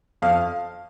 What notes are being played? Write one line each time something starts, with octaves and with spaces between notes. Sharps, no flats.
F2 F5